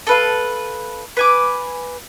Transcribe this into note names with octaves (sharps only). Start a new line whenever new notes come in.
A4 B4 F5
B4 G#5 D6